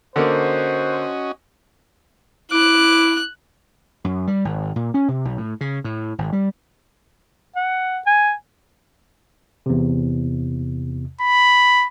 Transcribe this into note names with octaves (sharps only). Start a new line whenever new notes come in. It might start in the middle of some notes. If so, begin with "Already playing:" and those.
D3 A#3 C#4 F#4 C5 D#5
E4 D6 F#6
F#2
G3
G#1
A#2
C#4
C3
B1
A2
C#3
A2
G#1
G3
F#5
G#5
E2 C3
B5